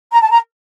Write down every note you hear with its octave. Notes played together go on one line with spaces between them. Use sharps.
A#5
A5
A#5